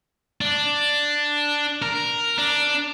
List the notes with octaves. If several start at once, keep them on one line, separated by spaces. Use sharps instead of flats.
D4
A#4
D4